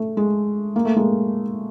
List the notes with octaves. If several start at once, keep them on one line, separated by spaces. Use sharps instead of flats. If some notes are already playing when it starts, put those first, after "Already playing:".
Already playing: A3
G#3
A#3
A3
G#3 A#3